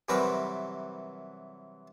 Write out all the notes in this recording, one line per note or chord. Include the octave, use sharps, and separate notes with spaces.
C3 E3 F#3 G3 A#4 B4